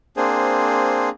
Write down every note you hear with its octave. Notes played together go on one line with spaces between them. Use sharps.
A#3 C4 D4 G#4 C5